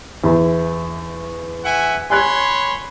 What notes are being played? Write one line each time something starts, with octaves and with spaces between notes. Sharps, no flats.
E2 E4
E5 F#5 G#5
C#5 G#5 B5 C6 F#6 G#6